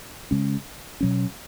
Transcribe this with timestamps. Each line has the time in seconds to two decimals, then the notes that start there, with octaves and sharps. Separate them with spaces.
0.31 C#3 G#3 C#4
1.01 B2 F#3 C#4